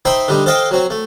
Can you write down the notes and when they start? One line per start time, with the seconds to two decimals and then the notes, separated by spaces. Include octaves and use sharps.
0.05 D#4 C5 E5 G5 B5 C6
0.28 D3 G3 D#4
0.46 A4 C5 D#5 F5 G5
0.71 F#3 C4
0.90 A3